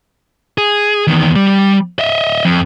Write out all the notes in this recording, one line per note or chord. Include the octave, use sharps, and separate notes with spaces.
G#4
E2 D#3
G3
D#5 E5
F2